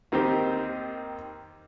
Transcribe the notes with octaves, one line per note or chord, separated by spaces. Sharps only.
D#2 D#3 C4 G4